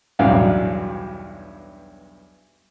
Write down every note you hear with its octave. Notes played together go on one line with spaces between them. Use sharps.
B1 E2 G2 F#3 D5 F5